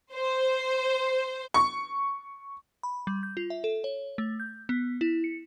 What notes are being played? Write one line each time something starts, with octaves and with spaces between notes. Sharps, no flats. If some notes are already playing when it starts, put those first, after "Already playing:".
C5
C#6
B5
G3
G6
F4
E5
A4
C#5
A3
G6
B3
E4
C#7